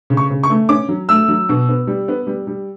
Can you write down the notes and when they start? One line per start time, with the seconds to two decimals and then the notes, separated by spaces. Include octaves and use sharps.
0.10 C#3
0.17 C#6
0.30 C#3
0.43 C#6
0.50 A3
0.69 C#4 D6
0.89 F#3
1.09 A3 E6
1.28 F#3
1.49 B2
1.69 B3
1.87 G3
2.08 B3
2.27 G3
2.47 G3